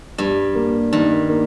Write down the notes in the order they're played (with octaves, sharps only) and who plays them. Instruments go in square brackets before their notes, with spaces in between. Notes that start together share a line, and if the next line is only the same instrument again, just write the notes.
[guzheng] G2 [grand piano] G3
[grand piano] A#3
[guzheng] G2 [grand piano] D#3
[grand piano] A#3